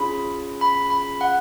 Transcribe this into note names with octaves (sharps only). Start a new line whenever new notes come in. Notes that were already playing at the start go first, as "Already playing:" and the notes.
Already playing: C#4 F4 G#4 B5
B5
B5
F#5